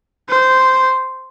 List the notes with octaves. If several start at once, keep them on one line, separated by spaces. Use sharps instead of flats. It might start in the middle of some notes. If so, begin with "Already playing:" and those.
C5